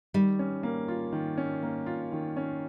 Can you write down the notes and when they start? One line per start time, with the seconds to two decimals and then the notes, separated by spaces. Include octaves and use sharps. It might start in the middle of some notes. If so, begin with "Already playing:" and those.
0.14 D#3 G3
0.39 C#4
0.63 A#3
0.88 F4
1.13 D#3
1.38 C#4
1.63 A#3
1.86 F4
2.12 D#3
2.37 C#4